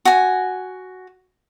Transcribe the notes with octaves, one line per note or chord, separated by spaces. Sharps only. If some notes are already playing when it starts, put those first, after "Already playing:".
F#4 G#5